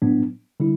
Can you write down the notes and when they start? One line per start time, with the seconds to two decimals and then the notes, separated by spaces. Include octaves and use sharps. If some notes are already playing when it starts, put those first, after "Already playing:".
0.02 A2 F#3 B3 D4
0.60 D3 G3 E4